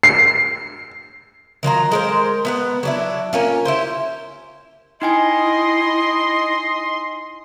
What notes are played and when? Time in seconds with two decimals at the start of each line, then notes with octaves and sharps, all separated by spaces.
0.03 C7
1.63 D#3 F#3 F4 A#5
1.91 G#3 A#4 C5
2.45 B3 F5 F#5
2.83 F#3 D4 E4
3.33 A#3 C#4 F4
3.65 E4 G4 C5
5.02 D#4 E4 D#5 G5 G#5 C6